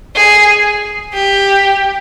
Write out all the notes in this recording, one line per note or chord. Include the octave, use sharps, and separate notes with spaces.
G#4
G4